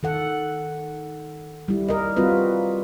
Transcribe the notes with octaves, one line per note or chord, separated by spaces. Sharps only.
D#3 A4 F#5
G3 E4
A#4 D#5
G3 C4 F4 F#4 B4